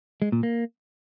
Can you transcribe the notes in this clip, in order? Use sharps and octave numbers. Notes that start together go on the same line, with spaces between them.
G#3
A#2
A#3